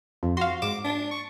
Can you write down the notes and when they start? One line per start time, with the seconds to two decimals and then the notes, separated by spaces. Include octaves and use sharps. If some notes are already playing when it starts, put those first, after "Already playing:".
0.23 F2
0.37 F#4 F5 C6
0.62 G#2 D6 E7
0.84 D4
1.11 C#6